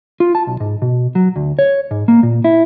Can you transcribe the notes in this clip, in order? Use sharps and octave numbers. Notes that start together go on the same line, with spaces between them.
F4
A5
B1
G#2
B2
F#3
D2
C#5
G#2
A#3
A#2
E4